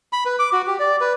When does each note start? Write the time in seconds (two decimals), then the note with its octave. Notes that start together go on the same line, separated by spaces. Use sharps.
0.13 B5
0.26 B4
0.39 D6
0.52 F#4
0.67 G4
0.79 D5
1.01 B4